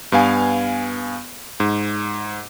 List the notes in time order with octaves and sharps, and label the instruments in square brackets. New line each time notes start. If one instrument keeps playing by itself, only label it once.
[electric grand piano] G2 B3 F5 G#5
G#2